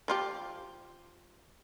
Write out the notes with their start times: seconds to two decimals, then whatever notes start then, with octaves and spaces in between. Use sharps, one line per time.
0.08 F3 F4 G4